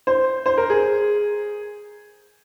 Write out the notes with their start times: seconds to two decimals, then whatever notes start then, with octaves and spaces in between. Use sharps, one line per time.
0.07 C5
0.46 C5
0.58 A#4
0.70 G#4